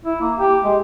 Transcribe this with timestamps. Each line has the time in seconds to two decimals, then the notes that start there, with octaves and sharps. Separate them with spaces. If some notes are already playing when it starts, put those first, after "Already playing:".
0.05 E4
0.22 A#3
0.37 G4
0.64 G#3